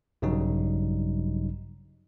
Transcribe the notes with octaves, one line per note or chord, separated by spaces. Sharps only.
A#1 G2 C#3 F#3 G3 D#4